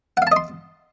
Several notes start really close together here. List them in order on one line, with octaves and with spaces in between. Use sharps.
F#5 F5 A5 D#5 C6